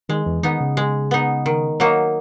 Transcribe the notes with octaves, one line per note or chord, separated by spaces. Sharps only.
D#3 G#3
E2 E3
D#3 B3 D#4
C#3
G#3
B3 D#4
D#3
F#3 A#3 D#4